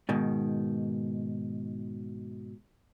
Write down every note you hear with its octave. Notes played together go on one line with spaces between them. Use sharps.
G#2 B2 D#3